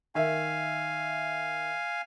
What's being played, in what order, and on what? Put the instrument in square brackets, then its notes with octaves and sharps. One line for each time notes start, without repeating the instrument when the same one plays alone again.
[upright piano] D#3 E5 [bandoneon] F5 G#5